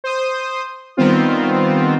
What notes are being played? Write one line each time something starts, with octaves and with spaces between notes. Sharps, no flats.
C5 D#6
D#3 G3 B3 C4 F4